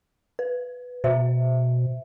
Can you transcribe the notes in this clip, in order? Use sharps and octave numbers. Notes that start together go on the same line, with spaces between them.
B4
B2 C5 E5